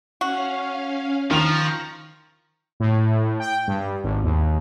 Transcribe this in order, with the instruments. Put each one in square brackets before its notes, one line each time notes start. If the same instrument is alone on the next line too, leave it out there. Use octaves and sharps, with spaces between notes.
[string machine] C#4 F5 [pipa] F#4
[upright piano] D#3 F7 [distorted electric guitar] F3 [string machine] C#6 A#6
[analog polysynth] A2
G5
G2
G#1
D#2